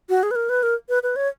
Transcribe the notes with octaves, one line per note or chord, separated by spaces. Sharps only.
F#4
G#4
B4
A#4
B4
A#4
B4
B4
C#5